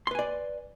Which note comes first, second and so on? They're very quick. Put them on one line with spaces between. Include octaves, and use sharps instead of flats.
C6 B4 G#5 D5